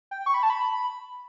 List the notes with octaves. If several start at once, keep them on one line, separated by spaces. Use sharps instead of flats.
G5
C#6
B5
A5
B5